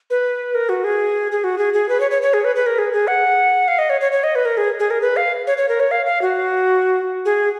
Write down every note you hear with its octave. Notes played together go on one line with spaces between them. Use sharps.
B4
A#4
F#4
G#4
G#4
F#4
G#4
G#4
B4
C#5
C#5
C#5
G#4
B4
B4
A#4
G#4
G#4
F#5
F5
D#5
C#5
C#5
C#5
D#5
B4
A#4
G#4
G#4
A#4
B4
F5
C#5
C#5
A#4
C#5
F5
F5
F#4
G#4